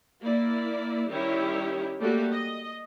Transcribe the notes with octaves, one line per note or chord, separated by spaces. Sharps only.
A#3 E4 D5
D#3 G3 C#4 E4 G4 C#5
G3 A3 A#3 F#4 G4
D#5